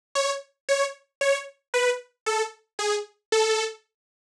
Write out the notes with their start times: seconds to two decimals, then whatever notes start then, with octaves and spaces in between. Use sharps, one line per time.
0.15 C#5
0.69 C#5
1.21 C#5
1.74 B4
2.26 A4
2.79 G#4
3.32 A4